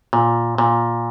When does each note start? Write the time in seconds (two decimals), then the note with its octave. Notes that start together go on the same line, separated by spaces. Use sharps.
0.13 A#2
0.58 A#2